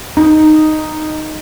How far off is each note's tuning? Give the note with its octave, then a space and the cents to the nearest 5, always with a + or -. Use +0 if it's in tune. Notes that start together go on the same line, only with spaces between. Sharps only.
D#4 -5